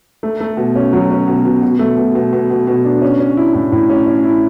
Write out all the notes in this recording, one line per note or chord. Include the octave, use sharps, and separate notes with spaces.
A3
A3
B2
C#4
F#3
C#4
B2
B2
B2
A3
B2
B2
B2
B2
B2
D4
C#4
C#4
E4
A2
A2
C#4
C#4
E4